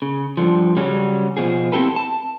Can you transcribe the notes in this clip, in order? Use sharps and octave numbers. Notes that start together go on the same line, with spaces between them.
C#3
G2 A#2 D3 F3
C#3 F#3 G3 C#4
B2 F3 G#4
C4 E4 G4 A4 B4
A5